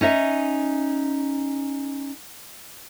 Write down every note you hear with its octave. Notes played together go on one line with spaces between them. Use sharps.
C#4 D#4 D#5 E5